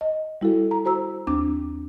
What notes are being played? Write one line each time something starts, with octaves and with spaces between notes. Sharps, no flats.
D#5
G3 E4 F#4 A4
A#5
F#4 C5 A#5 E6
D#2 C4 D4 D6